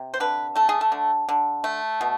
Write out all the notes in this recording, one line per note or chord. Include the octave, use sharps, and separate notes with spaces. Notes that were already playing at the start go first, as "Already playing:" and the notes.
Already playing: C3
C5
D3 B4
A3 A4
G#4
A4
D3
D3
A3
B2